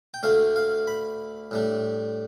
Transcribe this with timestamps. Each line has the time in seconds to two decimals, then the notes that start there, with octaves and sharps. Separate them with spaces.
0.14 G5
0.23 D2 D3 A3 D4 F5
0.56 F5
0.87 B5
1.51 A2 G3 D4